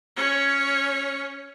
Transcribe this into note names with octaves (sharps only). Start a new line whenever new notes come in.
C#4 C#5